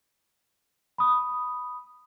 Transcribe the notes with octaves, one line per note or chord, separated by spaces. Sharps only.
B5 D#6